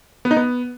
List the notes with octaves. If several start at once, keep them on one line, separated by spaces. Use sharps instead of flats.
B3
D#4
B3